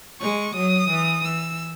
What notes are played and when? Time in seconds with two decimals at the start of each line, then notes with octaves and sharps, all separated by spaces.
0.21 G#3 C#6
0.56 F#3 D#6
0.91 E3
1.25 E3 E6